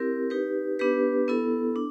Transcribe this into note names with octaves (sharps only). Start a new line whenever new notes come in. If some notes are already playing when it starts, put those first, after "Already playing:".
Already playing: C4 E4 G4 A#4
D#4 G4 B4
B3 D4 G4 B4
B3 E4 A4
D4